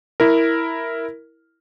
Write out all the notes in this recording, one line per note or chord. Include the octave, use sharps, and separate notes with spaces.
E4 A#4